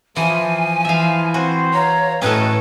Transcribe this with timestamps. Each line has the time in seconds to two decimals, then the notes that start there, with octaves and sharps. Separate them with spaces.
0.16 E3 F3 G#5
0.85 E3 E5 F5
1.34 C4 F#4 C5
1.73 B4 C#5 F5 A#5
2.22 A2 C#4 F#4 A4 B4 D#5 G5